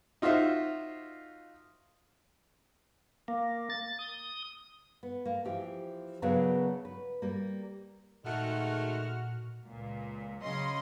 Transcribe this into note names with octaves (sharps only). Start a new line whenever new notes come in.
D#4 F4 F#4 C5 E5
A#3
A6
D#6
B3
A#3
E3 F3 G4
C#3 F#3 B3 D4 G#4 A#4
B4
G3 A#3
A#2 D#3 G#3 A3 F#4 F#5 F6
C#2 A#2
C#3 F#3 C#4 D#5 C6